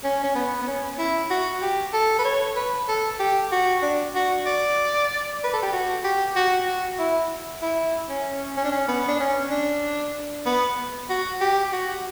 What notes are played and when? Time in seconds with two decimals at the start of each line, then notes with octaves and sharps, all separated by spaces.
0.04 C#4
0.24 C#4
0.35 B3
0.62 B3
0.68 C#4
0.98 E4
1.30 F#4
1.62 G4
1.93 A4
2.19 B4
2.25 C#5
2.56 B4
2.88 A4
3.20 G4
3.52 F#4
3.82 D4
4.15 F#4
4.46 D5
5.44 B4
5.53 A4
5.63 G4
5.73 F#4
6.04 G4
6.36 F#4
6.67 F#4
6.99 E4
7.62 E4
8.09 C#4
8.57 C#4
8.64 D4
8.72 C#4
8.88 B3
9.08 D4
9.20 C#4
9.51 D4
10.46 B3
11.10 F#4
11.41 G4
11.73 F#4